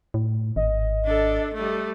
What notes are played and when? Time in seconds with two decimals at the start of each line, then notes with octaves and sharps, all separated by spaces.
0.14 A2
0.56 G#1 D#5
1.05 D4 A4
1.54 G3 A3